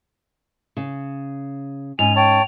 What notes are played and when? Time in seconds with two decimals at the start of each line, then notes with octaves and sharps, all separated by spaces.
0.77 C#3
1.99 G#2 C#4 G#5 F7
2.16 C#5 G5 A5